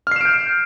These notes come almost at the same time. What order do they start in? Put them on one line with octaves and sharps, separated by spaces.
F6 C7 E7 D7 G6